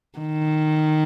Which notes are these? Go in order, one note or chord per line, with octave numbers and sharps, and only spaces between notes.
D#3